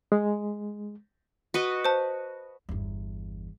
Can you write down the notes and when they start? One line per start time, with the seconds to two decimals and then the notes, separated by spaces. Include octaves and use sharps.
0.12 G#3
1.54 F#4 B4 D#5
1.85 C5 A5
2.69 G1 E2